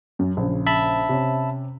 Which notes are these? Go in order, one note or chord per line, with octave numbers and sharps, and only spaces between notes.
F#2
A#1 C#3
E5 A5 B5
C3 C#4